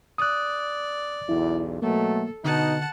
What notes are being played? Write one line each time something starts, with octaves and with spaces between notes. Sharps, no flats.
D5 D#6 F#6
B1 E2 E4
B2 F#3 A3 A#3 A4
B2 D3 D#4 F#5 A5